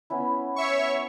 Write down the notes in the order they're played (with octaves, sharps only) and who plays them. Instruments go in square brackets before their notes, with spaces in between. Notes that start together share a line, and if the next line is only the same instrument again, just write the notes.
[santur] B3 C#4 E4
[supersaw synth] C#5 E5 C#6